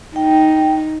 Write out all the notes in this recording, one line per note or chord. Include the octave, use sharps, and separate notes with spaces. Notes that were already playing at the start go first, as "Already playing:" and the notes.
D#4 G5